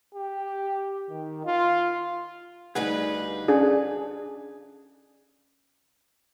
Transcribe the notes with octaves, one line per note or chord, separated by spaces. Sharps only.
G4
D#3
F4
D2 G3 D#4 G#4 B4 F5 F#5
C#4 D4 G#4